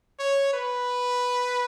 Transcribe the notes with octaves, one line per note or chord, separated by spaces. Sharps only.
C#5
B4